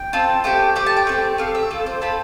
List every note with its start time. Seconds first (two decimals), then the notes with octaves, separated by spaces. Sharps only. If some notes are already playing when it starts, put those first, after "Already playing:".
Already playing: G5
0.13 C4 F4 A4
0.44 A3 C4 G4 G5
0.76 A3 C4 G4 G5
0.86 A5
0.97 G5
1.07 A3 C4 G4
1.38 A3 C4 G4 F5
1.55 E5
1.71 C4 F4 A4
1.86 C5
2.01 C4 F4 A4 B5